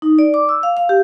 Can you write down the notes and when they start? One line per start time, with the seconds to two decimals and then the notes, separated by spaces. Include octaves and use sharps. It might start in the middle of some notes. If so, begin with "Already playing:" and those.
0.02 D#4
0.19 D5
0.34 D6
0.49 E6
0.63 F5
0.77 F5
0.89 G4